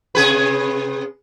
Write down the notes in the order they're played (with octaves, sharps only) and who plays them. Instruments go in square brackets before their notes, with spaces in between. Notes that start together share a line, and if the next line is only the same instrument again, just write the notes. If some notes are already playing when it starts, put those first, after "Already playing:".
[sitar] C3 G#4 B4